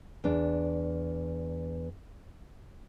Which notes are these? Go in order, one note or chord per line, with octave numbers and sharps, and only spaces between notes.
E2 D4